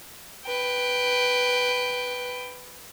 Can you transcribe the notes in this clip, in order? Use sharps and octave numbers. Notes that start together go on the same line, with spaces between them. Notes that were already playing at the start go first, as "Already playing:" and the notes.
B4 G5